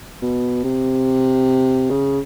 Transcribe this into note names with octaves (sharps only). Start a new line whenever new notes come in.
B2
C3
C#3